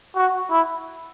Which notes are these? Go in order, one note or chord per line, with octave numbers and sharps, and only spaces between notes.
F#4
E4